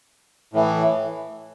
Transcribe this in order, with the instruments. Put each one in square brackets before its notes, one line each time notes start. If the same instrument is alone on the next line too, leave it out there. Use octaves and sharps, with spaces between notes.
[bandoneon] A2 E3